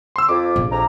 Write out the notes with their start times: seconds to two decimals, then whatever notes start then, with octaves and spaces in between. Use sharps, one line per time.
0.16 C6 E6
0.29 F2 D6
0.56 A#1
0.70 F2 A#5